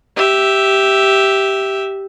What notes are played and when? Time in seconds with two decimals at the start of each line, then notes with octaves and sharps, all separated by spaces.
0.16 G4 E5